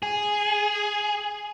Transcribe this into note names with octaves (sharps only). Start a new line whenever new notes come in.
G#4